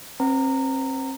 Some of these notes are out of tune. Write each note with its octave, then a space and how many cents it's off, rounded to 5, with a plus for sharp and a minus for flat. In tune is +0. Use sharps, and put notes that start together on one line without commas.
C4 +35 B4 +0 A#5 -20